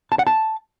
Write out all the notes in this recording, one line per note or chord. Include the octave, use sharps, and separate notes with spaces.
A5
F#5
A5